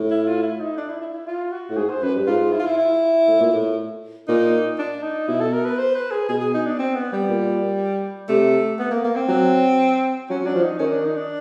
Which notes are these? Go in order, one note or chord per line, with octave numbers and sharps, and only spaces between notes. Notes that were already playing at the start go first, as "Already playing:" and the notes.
Already playing: A2
E4
F4
E4
D#4
D4
E4
E4
E4
F4
F#4
A2
G#2 G#4
C5
F#2 B4
G2
G#2 F4
E4
F4
E4
E4
A2
A#2
A2
A#2 D#4
D4
D#4
B2 E4
A4
A#4
B4
C5
B4
G#4
B2 G#4
G#4
D#4
D4
C4
B3
G3
A#2
C3 A3
B3
A#3
A#3
C4
F#3
F#3 C#4
F#3 D4
F3
D#4
D#3 C#4
D4
D#4
D4